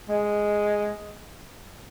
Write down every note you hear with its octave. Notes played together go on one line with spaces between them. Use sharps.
G#3